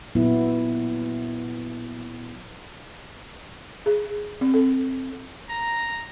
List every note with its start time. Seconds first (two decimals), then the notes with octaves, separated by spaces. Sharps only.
0.15 A#2 F#3 B3 E4
3.86 G#4
4.41 C4
4.54 A4
5.49 A#5